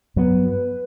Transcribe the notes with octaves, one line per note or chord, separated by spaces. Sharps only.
G2 F#3 B3 B4